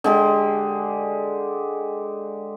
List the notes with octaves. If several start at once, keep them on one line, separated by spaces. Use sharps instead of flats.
D3 G#3 G4